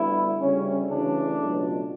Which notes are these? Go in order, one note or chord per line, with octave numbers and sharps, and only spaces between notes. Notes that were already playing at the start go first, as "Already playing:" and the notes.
Already playing: D2 D3 G3 B3 E4
D2 C#3 G3 C#4
D2 C#3 E3 A3 D4
C#2 B2 F#3 A3